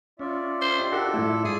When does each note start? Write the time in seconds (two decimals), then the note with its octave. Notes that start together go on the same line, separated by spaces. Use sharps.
0.19 C#4 F4 D5 E5
0.61 C5
0.77 G4 D#5
0.92 D4 F#4 G4 A4 A#4 F#5
1.14 A2 A3 E4
1.45 G#2 G#4